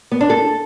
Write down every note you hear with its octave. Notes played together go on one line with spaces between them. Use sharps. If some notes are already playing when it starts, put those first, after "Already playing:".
B3
D4
A4